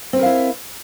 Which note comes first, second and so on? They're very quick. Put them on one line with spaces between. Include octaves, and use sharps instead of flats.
C4 B4 A#4 F5 E4